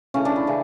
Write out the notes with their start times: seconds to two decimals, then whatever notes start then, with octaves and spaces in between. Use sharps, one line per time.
0.14 C#3 E3 A3 C#4
0.25 D4
0.36 E4
0.47 C#3 E3